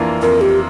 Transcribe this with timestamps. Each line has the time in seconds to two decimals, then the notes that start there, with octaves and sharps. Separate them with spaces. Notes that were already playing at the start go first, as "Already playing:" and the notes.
Already playing: F2 E3 A#3 D4 F4
0.22 F2 A#4
0.41 G4